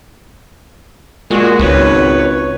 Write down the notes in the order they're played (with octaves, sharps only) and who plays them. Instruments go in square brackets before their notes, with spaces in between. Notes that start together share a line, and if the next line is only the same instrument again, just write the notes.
[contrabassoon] A#2 [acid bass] G#3 [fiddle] F#4
[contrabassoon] G#1 [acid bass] C#2 [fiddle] B4 C#5